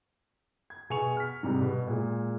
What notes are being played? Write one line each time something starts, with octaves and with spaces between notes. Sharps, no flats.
G#6
B2 G#4 G#5 C#6 C#7 F7
F6 B6
G#2 C3 G3 G#3
B2
A#2 G#3